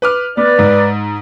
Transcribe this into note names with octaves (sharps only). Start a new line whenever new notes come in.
B4 D6 F6
B3 B4 D5
G#2